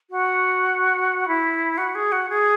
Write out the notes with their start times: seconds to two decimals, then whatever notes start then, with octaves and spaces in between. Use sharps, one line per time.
0.10 F#4
1.28 E4
1.78 F#4
1.95 G#4
2.12 F#4
2.29 G#4